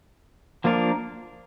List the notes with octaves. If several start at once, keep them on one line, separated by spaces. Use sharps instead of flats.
F3 A#3 D4 F4 A#4